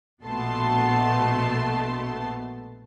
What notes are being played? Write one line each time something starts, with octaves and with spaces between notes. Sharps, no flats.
A#1 B2 A3 B3 A5 C6